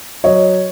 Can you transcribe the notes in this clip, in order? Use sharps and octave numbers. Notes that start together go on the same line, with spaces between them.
F#3 C#5 D#5